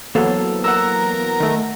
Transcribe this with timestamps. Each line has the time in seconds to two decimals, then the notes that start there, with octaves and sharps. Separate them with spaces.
0.15 E3 F#3 A#3 B3 A4 C5 F5
0.64 A#4 F#5 A#5 E6
1.40 D#3 A3